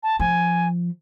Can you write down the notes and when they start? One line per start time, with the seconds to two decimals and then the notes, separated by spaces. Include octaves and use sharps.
0.03 A5
0.19 F3 G#5